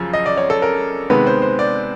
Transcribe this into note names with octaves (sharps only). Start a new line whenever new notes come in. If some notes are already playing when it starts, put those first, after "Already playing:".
Already playing: F#2 C#3 F3
D#5
D5
C#5
A4
A#4
C3 D#3 G#3 B3 B4
C5
C5
D5